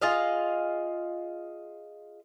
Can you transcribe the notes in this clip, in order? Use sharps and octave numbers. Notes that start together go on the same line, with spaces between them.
F4 G#4 D#5 F5